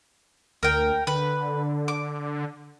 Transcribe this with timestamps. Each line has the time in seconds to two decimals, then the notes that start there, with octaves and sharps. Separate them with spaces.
0.63 D2 A#4 G5
1.07 D3 B4
1.88 D6